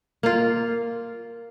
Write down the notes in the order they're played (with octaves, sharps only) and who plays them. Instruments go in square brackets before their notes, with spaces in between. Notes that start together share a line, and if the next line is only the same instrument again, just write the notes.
[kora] A#3 F4